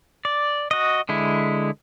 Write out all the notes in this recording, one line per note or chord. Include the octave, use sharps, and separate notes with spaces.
D5
F#4 D#5
D3 G#3 E4